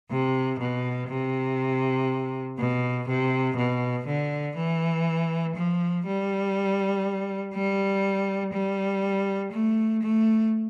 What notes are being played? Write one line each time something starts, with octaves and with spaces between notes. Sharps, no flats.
C3
B2
C3
B2
C3
B2
D3
E3
F3
G3
G3
G3
A3
A3